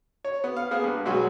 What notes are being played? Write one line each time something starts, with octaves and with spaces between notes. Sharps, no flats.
C#5
B3
F5
A#3 B3 G#4
G2
B1 F#3 G#3 F#4